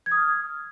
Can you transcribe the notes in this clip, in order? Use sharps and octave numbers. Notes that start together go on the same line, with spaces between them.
G#6
D#6
F6